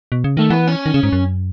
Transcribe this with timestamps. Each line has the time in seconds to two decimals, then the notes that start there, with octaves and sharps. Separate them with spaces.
0.12 B2
0.24 C#3
0.37 D#3 A3
0.50 E3 B3
0.67 C#4
0.86 D#3
0.94 C#3
1.03 G#2
1.12 F#2